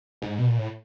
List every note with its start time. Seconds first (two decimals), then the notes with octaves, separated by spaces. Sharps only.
0.22 G#2
0.38 B2
0.48 A#2
0.58 A2